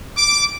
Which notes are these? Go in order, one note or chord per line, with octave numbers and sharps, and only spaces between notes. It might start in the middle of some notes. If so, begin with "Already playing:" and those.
D6